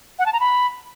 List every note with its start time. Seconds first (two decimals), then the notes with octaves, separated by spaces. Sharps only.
0.19 F#5
0.26 A5
0.33 A#5
0.40 B5